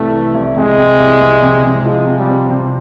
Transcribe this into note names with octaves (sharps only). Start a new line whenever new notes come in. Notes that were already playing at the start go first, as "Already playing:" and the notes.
Already playing: C2 C3 E3 A3
E3
C2
C3 G#3
C3
C2
C2
C3
C3
F3 G#3
C3
G3
C4
C3